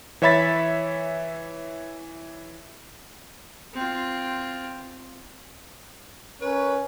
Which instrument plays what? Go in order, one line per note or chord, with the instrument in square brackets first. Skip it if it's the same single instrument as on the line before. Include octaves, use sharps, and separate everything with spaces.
[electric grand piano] E3 C#5 E5 B5 A6 B6
[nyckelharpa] C4 F4
[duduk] C#4 [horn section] A#4 B4 C#5